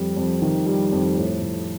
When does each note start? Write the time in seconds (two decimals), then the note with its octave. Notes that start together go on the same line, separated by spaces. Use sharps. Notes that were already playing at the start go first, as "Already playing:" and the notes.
Already playing: F2 G3
0.17 F2
0.42 D#3
0.67 G3
0.92 F2
1.17 A2
1.42 A2